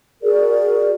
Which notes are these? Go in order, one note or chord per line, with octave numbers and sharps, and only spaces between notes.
F#4 G#4 A#4 D5